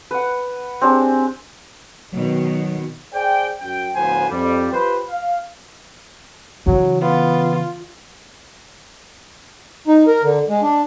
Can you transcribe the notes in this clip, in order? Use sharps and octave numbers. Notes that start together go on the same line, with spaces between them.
B4 F#5
C4 D4 G4 G#4
B2 D#3 F#3 B3
G#4 C5 D5 G5
F#2 G5
D2 A2 F3 B3 C5 G#5
F2 G3
F4 G4 B4 C5
F5
C#3 E3 F#3
B3 F4
D#4
A#4
D3
G#3
D4